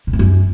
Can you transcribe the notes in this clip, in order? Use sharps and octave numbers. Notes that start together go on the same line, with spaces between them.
A#2
E3
F#2